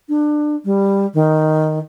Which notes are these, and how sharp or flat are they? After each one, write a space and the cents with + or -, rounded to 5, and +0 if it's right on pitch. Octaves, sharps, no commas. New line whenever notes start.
D4 +25
G3 +10
D#3 +0